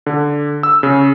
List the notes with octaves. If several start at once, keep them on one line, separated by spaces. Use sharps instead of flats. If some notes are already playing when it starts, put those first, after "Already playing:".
D3
E6
C#3